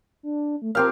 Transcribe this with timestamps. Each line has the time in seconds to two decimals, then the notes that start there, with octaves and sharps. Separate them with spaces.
0.23 D4
0.62 A3
0.75 C4 G4 A#4 F5